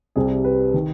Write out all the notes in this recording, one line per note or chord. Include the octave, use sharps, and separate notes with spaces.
C2 C3 G3 G#4
B4
D#3